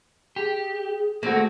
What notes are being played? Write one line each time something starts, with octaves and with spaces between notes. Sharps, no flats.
G4 G#4
A3 A#3 C4 F#4